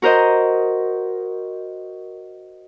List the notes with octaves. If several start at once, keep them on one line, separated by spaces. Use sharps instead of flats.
F#4 A#4 C5 D#5